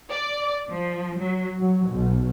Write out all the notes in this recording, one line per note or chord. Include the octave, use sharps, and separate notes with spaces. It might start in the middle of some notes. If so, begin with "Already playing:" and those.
D5
F3
F#3
F#3
B1